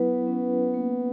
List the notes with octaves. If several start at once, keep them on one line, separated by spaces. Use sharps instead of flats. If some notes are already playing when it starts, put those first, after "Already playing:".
Already playing: F#3 B3 E4 B4
C#4
A#3